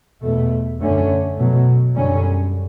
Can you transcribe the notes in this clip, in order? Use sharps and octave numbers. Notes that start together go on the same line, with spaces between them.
E2 B2 A3
F#2 D3 A3 C#4
B2 F#3 A3
F#2 D3 G3 C#4